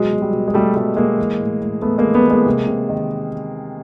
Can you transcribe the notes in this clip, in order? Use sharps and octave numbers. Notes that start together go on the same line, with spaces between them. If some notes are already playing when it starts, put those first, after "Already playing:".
Already playing: B2 F#3 G#3
B2
G3
B2
G#3
B2 G3 A3
B2 G3 A3
B2 G#3 A#3
E3
A2
A2
A2 A3 B3
G#3 A#3
E3
A3 B3
E3
G#3 A#3
C3
C3
D#3